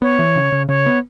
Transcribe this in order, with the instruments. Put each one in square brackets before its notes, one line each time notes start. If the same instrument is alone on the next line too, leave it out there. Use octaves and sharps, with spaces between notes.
[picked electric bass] B3 [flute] C#5
[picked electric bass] E3
C#3
C#3
[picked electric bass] C#3 [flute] C#5
[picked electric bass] B3